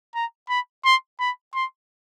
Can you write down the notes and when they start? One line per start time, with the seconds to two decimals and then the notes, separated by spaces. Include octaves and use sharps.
0.15 A#5
0.49 B5
0.85 C6
1.20 B5
1.54 C6